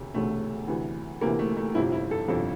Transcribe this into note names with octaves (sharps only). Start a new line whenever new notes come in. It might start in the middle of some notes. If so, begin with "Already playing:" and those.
Already playing: E1 D2 C3
E1 D2 C3 A3
D2 C3 E3
D2 C3 E3 A#3
A3
A3
G1 F2 C3 F3 E4
E4
A4
G1 F2 C3 F3 A4